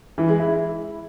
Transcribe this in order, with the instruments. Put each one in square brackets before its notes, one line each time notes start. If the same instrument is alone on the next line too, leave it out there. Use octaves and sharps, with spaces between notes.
[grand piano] E3
G#3
E4